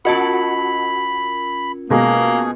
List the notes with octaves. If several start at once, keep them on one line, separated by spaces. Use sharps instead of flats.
C#4 F4 F#4 A#4 D#5 A5 B5
B2 G#3 A#3 G#4 A#6